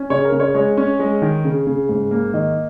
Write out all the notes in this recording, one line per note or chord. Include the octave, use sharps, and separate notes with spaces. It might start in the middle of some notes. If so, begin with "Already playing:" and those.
Already playing: C#4
C#3 C#5
A#4
C#3
C#5
G#3 C#5
C#4
G#3
D#3
C#3
C#3
G#2
A#3
D#3 D#5